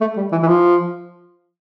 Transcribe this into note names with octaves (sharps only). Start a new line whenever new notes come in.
A3
G3
E3
E3
F3